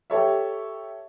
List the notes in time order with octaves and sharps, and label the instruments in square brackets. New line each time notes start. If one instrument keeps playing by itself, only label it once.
[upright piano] G4 A4 C#5 E5